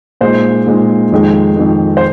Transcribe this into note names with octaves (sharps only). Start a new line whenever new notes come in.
A#2 G#3 D#4 C5
A#2 G#3 D#4
F2 D#3 G#3
F2 D#3 G#3
C5